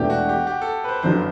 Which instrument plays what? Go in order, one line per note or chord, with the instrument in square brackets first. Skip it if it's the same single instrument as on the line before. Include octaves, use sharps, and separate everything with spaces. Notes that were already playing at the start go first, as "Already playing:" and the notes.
Already playing: [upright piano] E1 E2 B2 A3 D4 [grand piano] G4
[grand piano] F#4
G4
G4
A4
B4
C5
[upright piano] G1 F#2 D3 F#3 [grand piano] C5